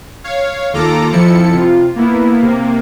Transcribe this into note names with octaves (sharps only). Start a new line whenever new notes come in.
C#5 F5
D#2 F4 A4 A#5 D6
F2 F3 E4 A4 C#7
C3 F4
A#3 B3 E4
C3 A#3